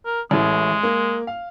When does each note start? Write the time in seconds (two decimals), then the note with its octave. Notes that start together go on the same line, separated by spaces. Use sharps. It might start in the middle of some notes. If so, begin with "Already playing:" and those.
0.06 A#4
0.31 A1 A2 G#3
0.83 A#3
1.27 F5